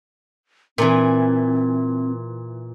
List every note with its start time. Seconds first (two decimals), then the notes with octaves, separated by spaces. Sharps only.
0.78 A#2 E3 C4